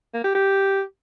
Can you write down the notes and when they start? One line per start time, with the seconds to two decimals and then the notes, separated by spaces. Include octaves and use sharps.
0.14 A#3
0.24 G4
0.35 G4